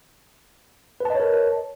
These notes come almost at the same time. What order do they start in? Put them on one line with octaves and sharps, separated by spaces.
B4 A5 D#5 C#5 A#4